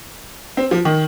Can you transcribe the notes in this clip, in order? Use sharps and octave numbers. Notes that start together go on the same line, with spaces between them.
C4
F3
D#3